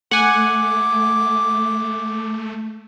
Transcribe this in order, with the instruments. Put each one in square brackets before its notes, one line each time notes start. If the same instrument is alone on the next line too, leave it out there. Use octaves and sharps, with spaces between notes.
[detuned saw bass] A3 [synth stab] F#5 G#5 [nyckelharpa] D6